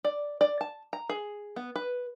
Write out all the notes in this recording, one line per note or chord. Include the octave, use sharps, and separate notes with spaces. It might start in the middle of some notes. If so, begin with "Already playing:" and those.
D5
D5
A5
A#5
G#4
B3
B4